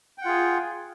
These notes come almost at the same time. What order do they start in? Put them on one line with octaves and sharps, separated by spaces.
G5 F#5 F4 G#4